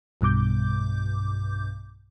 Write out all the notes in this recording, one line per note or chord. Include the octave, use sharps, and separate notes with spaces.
B1 G2 B2 D6 G6